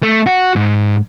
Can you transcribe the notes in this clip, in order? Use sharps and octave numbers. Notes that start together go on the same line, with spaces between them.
A3
F#4
G#2